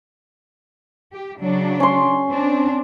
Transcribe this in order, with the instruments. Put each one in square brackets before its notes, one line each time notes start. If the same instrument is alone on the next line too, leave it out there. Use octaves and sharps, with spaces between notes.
[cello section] G4
C#3 F#3 D4
[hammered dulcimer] C#4 C6
[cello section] C4 D4